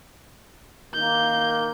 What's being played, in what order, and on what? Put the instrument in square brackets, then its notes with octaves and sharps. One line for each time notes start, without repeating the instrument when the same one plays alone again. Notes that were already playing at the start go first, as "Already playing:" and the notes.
[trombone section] D#3 A#3 [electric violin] G6